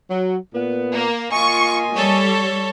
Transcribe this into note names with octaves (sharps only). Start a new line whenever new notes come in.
F#3
A#2 B3
A#3
A#3 F4 D#5 G#5 C#6
G3 A4 C#5